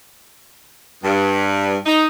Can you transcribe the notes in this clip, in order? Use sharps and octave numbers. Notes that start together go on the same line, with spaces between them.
G2
D#4